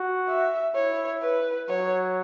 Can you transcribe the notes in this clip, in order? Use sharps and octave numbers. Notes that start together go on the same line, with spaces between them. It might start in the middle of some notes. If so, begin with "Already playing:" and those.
Already playing: F#4
E5
E4 C#5
B4
F#3 C#5